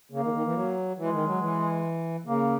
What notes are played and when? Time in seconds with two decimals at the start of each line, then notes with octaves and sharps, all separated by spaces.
0.11 C#3 A#3
0.23 D#3
0.33 D#3
0.45 E3
0.54 F#3
0.98 E3 G#3
1.12 D#3
1.26 F#3
1.40 E3
2.26 C#3 A#3